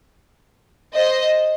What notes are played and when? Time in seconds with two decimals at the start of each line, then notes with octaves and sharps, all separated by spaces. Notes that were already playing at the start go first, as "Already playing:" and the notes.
0.94 C5 D#5